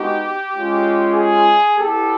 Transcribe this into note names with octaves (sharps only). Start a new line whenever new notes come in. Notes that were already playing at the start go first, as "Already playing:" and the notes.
Already playing: G#3 B3 D#4 F#4 G4
G#3 C#4 F4
G#4
G3 B3 E4 G4 A4